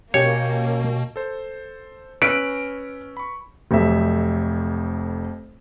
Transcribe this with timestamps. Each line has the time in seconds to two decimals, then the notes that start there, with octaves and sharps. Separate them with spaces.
0.14 B2 A#3 C#4 G4 C#5
1.16 A4 C5
2.22 C#4 B4 E6 F6 D7
3.17 B5 C#6
3.71 F1 F2 F#3 C4 E5